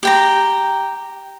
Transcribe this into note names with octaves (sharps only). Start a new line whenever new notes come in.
G4 G5 A#5